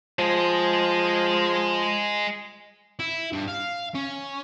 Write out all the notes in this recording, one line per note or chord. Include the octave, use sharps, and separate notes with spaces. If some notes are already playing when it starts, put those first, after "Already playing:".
F3 G#3 G#4
E4
G2
F5
C#4